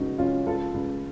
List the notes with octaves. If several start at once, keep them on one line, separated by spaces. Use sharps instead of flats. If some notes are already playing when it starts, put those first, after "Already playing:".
Already playing: C#2 F#3 D#4 F#4
C#2 C#4 F4
C#2 F4 A4
C#2